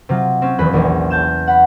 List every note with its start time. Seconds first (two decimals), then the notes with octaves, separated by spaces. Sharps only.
0.09 C3 F#3 F4
0.42 C4 C#4
0.59 D#1 E2 D#5 B5 F#6
0.73 A#1 E2 A#2
1.10 A5 G6 E7
1.47 F#5 B5